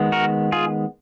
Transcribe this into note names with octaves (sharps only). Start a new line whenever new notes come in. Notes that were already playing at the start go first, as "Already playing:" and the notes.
Already playing: D#3 G#3 B3
F#4 A#4
F4 G#4